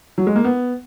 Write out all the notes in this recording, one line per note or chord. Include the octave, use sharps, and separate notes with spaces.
F#3
G#3
A#3
B3